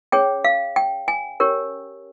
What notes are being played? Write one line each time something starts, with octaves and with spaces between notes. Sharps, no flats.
C#4 G#4 C#5 G5
F5
G5
G#5
C#4 G4 A#4 C#5